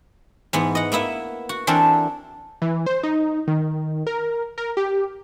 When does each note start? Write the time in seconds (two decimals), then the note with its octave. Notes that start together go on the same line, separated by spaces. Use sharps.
0.53 G#2 E3 B3
0.75 D#5 F#5
0.92 A#3 B3 E4 E5
1.49 F#4
1.67 E3 C4 D4 A4 A#4
2.62 E3
2.86 C5
3.03 D#4
3.47 D#3
4.07 A#4
4.58 A#4
4.77 G4